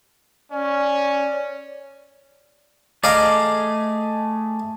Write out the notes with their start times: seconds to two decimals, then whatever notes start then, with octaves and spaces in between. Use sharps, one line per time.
0.52 C#4 C#5 D5
3.04 A3 G#4 D5 D#5 F5 A#5